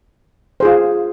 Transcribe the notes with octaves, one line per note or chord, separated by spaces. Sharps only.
F4 G#4 C5